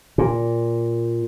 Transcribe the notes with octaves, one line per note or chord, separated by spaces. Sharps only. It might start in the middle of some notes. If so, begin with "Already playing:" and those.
A#2